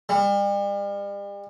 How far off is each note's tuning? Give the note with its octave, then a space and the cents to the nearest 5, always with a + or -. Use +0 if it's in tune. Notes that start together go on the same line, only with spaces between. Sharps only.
G3 +40